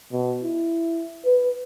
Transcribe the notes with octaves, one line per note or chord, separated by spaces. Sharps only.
B2
E4
B4